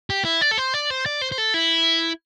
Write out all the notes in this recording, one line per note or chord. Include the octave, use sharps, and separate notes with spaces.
G4
E4
D5
A4
C5
D5
C5
D5
C5
C5
A4
E4